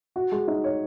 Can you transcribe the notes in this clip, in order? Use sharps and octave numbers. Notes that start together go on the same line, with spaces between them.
F#4
G#3
D#4
C#5